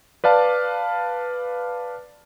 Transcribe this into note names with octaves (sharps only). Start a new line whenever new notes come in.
B4 D5 F5 A5